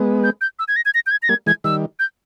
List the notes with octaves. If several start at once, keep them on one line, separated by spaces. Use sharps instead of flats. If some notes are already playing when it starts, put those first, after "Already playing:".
Already playing: G#3 B3
G6
G6
E6
G#6
A#6
G#6
A#6
G6
G#6
A#6
G3 A#3 G#6
E3 G#3 G#6
D#3 G3 E6
G6